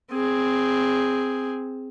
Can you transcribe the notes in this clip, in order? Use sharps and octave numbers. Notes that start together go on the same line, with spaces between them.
C4 G#4